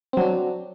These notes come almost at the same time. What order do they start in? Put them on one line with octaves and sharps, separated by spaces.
C4 F#3 D4